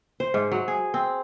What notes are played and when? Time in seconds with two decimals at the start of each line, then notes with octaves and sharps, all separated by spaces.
0.20 C5
0.34 G#2
0.52 F#3
0.68 G#4
0.94 C4